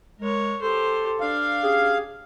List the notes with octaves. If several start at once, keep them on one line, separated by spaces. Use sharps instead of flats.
G#3 A#4 C#5
G4 A4 C5
D4 F5
C#4 G4 G#4